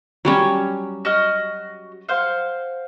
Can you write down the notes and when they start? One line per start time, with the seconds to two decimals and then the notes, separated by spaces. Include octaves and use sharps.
0.25 F#3 G3 C#4
1.05 F#4 D#5 F6
2.08 C5 F5 F#5